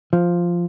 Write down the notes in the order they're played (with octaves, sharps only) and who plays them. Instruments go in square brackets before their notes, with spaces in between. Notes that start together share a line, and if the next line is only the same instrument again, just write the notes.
[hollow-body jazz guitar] F3